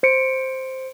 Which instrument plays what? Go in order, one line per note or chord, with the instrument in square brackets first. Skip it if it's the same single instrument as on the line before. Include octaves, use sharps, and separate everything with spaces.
[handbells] C5 C#7 D7